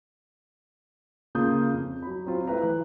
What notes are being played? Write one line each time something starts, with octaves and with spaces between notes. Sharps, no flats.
C#3 A#3 F4 D#6 G6
F2
F#3 B5
F#3 C4 F4
A3 E4 B4 A#5
E3 F#6